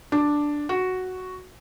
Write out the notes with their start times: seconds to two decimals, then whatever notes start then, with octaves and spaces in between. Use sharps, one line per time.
0.12 D4
0.69 F#4